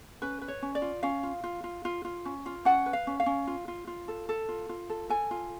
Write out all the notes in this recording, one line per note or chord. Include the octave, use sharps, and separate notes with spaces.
C#4 B4
B4
C#5
C#4
D5
F4
C#4 F5
F4
F4
F4
F4
F4
C#4
F4
C#4 F#5
B4
F5
C#4
F5
C#4
F4
F4
F4
A4
A4
F4
F4
A4
A4 G#5
F4